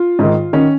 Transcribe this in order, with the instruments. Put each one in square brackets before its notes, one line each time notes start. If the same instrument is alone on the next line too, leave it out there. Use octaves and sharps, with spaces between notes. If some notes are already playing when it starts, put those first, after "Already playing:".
Already playing: [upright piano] F4
G#2 D#3
D#3 C#4